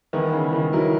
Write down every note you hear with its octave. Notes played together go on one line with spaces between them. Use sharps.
D#3 E3 B3 E4 A#4
C#3
D#3
E3 F#3 B3 E4 A#4